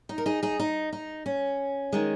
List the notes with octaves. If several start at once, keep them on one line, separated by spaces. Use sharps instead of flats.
D#4
A#4
D#4 G#4
D#4 G#4
D#4
D#4
C#4
D#3 G#3